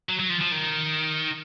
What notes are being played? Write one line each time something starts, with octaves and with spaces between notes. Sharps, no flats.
F#3
F#3
F3
F3
D#3